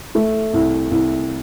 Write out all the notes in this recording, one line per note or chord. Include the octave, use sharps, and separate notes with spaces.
A3
C2
C2